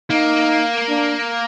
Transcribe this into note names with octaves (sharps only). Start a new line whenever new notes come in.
A#3 D#4
D4